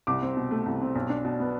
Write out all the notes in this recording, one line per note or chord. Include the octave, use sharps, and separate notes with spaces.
C2 D6
C4
B2
A3
C2
C4
B1
D4
B2
B3